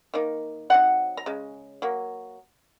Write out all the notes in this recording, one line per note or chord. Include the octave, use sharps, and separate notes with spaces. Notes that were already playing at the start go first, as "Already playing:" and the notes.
D#3 A#3 D#4
F#3 C4 D#4 F#5
A#5
C#3 G#3
F#3 A#3